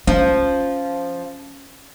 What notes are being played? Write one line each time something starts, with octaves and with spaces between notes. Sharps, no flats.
F3 C#4